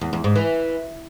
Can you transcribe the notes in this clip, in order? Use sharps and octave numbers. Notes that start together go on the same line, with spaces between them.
E2
E2
G#2
E3